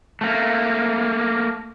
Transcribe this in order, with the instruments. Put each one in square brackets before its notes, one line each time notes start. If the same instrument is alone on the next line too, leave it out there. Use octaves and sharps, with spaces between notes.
[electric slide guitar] A3 A#3